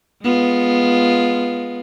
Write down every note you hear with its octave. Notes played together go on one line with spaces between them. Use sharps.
G#3 B3 F4